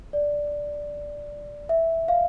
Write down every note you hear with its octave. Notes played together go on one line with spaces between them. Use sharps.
D5
E5
F5